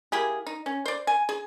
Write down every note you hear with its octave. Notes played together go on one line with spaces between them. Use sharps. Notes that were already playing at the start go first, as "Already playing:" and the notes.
A#3 E4 G4 G#4
D#4
C#4
C5 D5
G#5
G#4